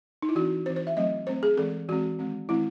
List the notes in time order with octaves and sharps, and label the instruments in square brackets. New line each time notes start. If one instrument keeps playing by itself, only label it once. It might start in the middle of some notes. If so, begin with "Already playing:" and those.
[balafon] D#4
E4
E3 C4 F#4
E3 C4 C5
C5
E5
F#3 A3 C4 D#5
F#3 A3 C4 C5
G#4
E3 G#3 C4 A4
E3 G#3 C4 F#4
D#3 G#3 C4
D#3 G#3 C4 E4